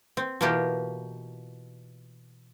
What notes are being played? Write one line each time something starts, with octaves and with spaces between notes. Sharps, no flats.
C4
B2 E3 A#3 F4 G4